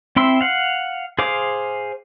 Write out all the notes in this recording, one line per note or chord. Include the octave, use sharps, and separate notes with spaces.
C4 E4 C6 E6
F5 F#5
G#4 C5 F5 D6